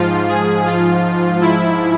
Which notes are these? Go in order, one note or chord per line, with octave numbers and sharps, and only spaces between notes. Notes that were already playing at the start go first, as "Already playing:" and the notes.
Already playing: G#2 F3 F4
G#4
F4
E4